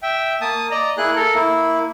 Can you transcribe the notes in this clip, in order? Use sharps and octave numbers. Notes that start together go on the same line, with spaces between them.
E5 G5
A#3 A5 D#6
D5 D#5 A#5
A#3 E4 G#4 F#6
A4 A#4
A#3 E4